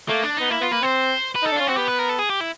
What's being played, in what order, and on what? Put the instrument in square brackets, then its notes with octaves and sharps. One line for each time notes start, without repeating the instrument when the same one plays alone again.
[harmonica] A3 [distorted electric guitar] A#3
[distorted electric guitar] D4
[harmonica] B3 [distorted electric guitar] D#4
[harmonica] A#3 [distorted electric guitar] E4
[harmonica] B3 [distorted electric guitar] F4
[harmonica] A#3 [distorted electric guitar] B4
[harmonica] C4 [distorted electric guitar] C5
[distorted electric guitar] B4
[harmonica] D#4 [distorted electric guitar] A4
[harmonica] D4
[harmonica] C#4 [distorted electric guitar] F4
[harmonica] C4 [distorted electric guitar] F#4
[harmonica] B3 [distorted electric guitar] G4
[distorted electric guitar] B4
A#4
A4
G#4
G4
E4